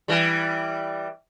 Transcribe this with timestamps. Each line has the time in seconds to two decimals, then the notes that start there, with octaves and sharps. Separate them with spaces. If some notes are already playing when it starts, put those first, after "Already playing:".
0.08 E3 G3